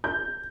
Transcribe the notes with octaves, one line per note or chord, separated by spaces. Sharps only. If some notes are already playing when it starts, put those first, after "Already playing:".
G6